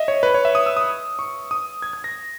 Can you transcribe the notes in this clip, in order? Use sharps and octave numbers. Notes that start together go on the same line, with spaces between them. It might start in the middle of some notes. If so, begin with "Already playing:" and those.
Already playing: D#5 E5
C#5
B4
C#5
E5
D#6
E6
D#6
C#6
D#6
G#6
G#6
A#6